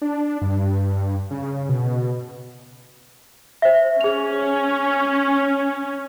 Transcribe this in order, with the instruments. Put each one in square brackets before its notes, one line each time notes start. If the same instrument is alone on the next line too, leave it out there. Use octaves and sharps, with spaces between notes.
[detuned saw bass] D4
G2
C#3
B2
[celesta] C5 E5
[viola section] C#4 [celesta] G#4 F7